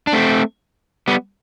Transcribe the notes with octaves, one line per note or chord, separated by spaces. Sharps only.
D4
A3 C4
G3 B3